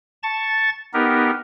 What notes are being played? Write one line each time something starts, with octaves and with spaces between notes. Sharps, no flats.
A5 C#6 A6
B3 D#4 G4 A#4